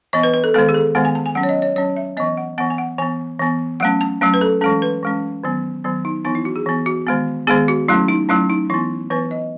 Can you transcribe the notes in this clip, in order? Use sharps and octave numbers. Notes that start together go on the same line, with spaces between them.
E3 B3 D#5
B4
B4
A4
D#3 G#3 B3 A4
G#4
A4
D#3 G#3 B3 F#5
G#5
A5
G#5
F#3 C#4 F#5
C#5
D#5
C#5
F#3 C#4 C#5
E5
E3 B3 D#5
F#5
E3 B3 F#5
G#5
F#5
E3 B3 G#5
E3 B3
F#3 A3 C#4 F#5
A5
F#3 A3 C#4
B4
A4
E3 G#3 C#4 A4
B4
E3 G#3 C#4
D#3 F#3 B3
D#3 F#3 B3
D#4
E3 B3 D#4
E4
F#4
G#4
E3 B3
F#4
D#3 G#3 B3
D#3 G#3 B3 G#4
F#4
F#3 A3 C#4 E4
D#4
F#3 A3 C#4 E4
D#4
E3 B3 E4
E3 B3 B4
D#5